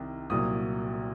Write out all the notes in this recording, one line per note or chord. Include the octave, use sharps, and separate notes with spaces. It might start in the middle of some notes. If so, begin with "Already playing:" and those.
Already playing: C2 C3 D#3
C2 A#2 F#3 D#6